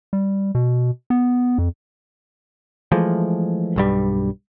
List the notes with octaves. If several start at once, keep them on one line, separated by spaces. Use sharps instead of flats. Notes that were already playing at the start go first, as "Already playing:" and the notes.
G3
B2
B3
F2
E3 F3 G#3 A3
B1 G2 G3